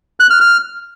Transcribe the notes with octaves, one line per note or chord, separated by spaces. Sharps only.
F#6
F6
F6